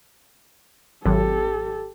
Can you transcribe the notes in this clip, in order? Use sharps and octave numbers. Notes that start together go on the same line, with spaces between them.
G#1 F#3 G4 A4